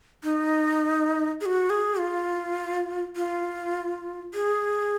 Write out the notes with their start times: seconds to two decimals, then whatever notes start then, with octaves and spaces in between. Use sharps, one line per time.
0.23 D#4
1.41 G#4
1.46 F#4
1.70 G#4
1.99 F4
3.16 F4
4.34 G#4